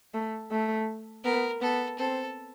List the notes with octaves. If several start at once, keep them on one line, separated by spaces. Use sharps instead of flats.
A3
A3
B3 A#4
B3 A4
C4 A4